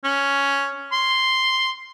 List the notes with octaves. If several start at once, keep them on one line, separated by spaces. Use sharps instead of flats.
C#4
C6